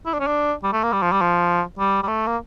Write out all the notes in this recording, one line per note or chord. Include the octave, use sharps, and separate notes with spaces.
E4
D4
C#4
D4
G3
A3
A#3
G3
F3
G3
F3
G3
G3
A3
A#3